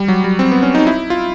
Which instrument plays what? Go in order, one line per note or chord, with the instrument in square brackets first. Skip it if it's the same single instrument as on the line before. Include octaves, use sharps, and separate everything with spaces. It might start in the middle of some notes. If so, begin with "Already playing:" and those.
Already playing: [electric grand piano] G3
F#3
G3
C4
B3
C#4
D#4
E4
F4